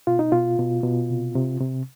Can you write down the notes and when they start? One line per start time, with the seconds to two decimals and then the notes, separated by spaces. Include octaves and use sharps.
0.07 B2 F4
0.19 D#4
0.32 B2 F4
0.59 B2
0.83 B2
1.10 C3
1.36 C3
1.60 C3